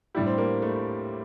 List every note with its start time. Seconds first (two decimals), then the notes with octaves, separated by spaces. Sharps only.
0.15 A2 G3 D4 E4 G4
0.27 C4
0.38 A#3
0.62 A3